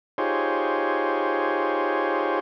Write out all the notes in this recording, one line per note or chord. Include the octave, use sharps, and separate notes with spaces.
D#4 F4 G4 G#4 C5 C#5